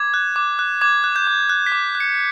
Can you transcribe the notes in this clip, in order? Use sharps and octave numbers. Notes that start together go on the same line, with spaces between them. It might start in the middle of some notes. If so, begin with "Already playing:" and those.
Already playing: D6 G#6
F#6
D6
F#6
D6 G#6
F#6
G6
D6
F#6 G6
B6
D6
F#6
C#7